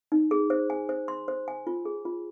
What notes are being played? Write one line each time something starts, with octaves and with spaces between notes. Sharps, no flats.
D#4
G#4
C5
G#5
C5
C6
C5
G#5
F4
G#4
F4